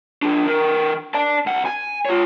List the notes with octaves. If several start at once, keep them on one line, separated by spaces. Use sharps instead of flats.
F3 D4
E3 A#4
D5 A5
C2 F#5
G#5
F4 C#5